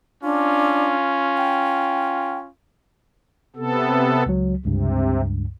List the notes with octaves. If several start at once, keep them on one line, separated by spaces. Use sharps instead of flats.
C#4 D4 F4
G5
C3 B3 A4
C#2 F#3
C#2 G2 C3